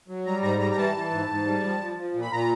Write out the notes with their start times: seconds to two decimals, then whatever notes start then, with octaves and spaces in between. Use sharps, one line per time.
0.08 F#3
0.26 G3 A#5
0.42 G#2 A#5
0.60 G3 A#5
0.71 A#5
0.77 E3 A5
0.95 E3
1.11 G#2
1.28 G#2
1.46 G3
1.63 F3
1.80 F3
1.97 F3
2.14 A#2
2.22 B5
2.31 A#2 A#5